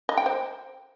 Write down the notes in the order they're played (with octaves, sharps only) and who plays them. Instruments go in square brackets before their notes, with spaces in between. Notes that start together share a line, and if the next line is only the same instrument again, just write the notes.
[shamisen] D#5
G5
C5